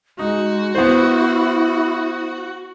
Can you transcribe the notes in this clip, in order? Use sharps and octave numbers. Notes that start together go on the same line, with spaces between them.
G#3 D#4 F#4
B3 E4 C5